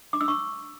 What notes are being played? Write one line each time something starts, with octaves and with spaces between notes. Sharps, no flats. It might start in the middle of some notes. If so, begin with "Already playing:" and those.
D6
E6
C#6